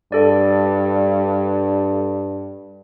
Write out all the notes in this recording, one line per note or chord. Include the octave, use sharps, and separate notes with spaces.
G2 A4 D5